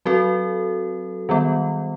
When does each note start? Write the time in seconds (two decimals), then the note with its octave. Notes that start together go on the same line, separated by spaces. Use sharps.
0.05 F#3 C4 F#4 A4
1.29 D#3 G3 B3